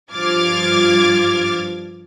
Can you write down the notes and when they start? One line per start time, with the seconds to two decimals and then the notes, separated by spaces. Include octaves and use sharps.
0.12 G2 F3 D6 F6 G#6 A6